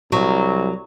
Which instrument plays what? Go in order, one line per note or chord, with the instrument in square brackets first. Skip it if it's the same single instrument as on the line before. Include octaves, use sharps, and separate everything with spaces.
[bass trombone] C2 [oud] F#3